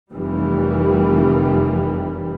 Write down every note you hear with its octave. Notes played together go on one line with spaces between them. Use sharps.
F1 D#3 E3 G3